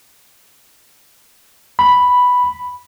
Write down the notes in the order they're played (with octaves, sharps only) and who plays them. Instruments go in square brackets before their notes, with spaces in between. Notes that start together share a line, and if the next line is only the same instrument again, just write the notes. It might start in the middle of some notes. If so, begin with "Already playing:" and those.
[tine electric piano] B5